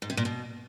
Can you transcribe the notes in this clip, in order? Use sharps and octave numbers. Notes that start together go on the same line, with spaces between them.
G#2
C3
A#2
B2